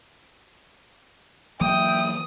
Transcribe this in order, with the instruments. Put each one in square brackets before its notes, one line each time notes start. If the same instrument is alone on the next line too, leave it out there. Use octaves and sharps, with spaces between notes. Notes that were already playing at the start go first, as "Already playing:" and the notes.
[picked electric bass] E3 F#3 A#3 [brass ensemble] E5 G5 [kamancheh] D#6